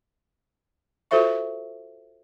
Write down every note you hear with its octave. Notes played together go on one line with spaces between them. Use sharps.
F4 F#4 A4 C5 E5 C#6